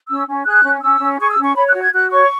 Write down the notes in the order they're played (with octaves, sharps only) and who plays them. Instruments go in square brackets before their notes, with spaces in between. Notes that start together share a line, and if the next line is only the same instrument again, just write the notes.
[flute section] C#4 E6
C#4
G#4 F#6
C#4
C#4 E6
C#4
G#4 C#6
E6
C#4
C#6
C#5 B5
F#6
F#4
G#6
F#4 F#6
C#5 C#6